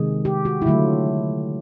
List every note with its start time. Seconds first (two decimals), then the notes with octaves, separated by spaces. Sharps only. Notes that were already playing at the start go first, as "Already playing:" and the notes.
Already playing: C3 D#3 G#3 G#4
0.25 G4
0.45 F#4
0.62 E4
0.66 D3 F#3 A3 F4